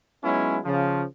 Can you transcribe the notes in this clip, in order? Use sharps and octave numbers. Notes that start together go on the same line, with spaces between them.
F#3 G#3 B3 C#4 D#4 E4
C#3 F3